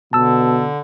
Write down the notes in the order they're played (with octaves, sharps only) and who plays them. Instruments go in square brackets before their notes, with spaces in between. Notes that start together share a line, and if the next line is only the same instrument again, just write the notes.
[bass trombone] B2 [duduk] D3 [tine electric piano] A5 E6